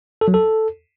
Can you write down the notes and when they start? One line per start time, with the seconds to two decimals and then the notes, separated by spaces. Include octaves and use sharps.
0.21 A4
0.28 F#3
0.34 A4